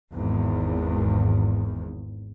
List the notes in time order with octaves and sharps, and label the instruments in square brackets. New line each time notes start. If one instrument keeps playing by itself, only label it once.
[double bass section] G#1 E2